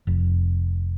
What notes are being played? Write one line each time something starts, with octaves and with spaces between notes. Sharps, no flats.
F1